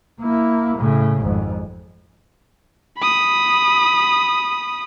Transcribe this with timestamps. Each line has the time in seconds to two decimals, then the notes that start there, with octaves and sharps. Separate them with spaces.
0.21 A#3 E4
0.77 A2 C#3
1.22 G#1 F2
2.99 B5 D#6